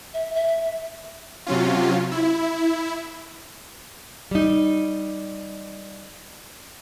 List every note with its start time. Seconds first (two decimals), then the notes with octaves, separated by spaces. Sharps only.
0.14 E5
0.35 E5
1.47 C3 F#3 C#4 F4
2.11 E4
4.31 G3 D#4